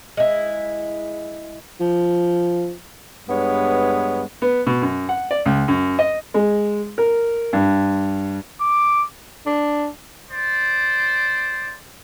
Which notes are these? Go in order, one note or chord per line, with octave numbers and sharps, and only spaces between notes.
G#3 E4
F3
G2 G#3 B3 C#5
B3
B2
F#2
F#5
D5
C#2
F#2
D#5
G#3
A#4
G2
D6
D4
C5 D5